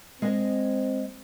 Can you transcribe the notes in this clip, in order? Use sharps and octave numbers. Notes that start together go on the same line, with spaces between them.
G#3 C4 D#5